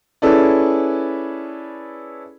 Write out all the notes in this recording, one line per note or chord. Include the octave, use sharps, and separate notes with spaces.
C#4 E4 G#4 A4 B4 D5